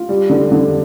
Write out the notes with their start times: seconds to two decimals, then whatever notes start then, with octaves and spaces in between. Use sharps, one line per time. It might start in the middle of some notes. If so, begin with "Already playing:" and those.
Already playing: F4
0.09 G3
0.30 D3
0.51 D3